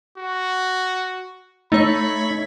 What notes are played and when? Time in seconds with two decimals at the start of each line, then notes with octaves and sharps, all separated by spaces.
0.18 F#4
1.72 A3 D#4 C#5 B5